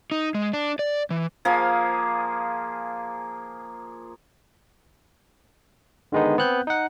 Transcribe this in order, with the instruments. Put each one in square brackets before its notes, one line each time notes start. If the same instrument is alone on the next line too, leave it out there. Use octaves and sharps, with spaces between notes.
[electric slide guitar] D#4
G#3
D4
D5
E3
[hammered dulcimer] F3 A#3 G#4 F5
[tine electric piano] D3 D#3 G#3 B3 D#4
B3 C4 F#6 G6
D#4 F#5